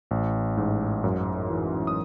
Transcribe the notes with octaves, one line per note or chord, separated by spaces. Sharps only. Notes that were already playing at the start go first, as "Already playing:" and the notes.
A1
G#2
F#2
E3
D#6